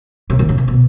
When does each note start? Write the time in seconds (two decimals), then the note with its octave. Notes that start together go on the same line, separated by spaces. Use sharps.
0.30 C3
0.39 D#3
0.49 C#3
0.58 C3
0.68 B2